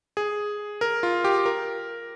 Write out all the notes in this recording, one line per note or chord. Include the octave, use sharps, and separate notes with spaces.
G#4
A#4
F4
G4
A#4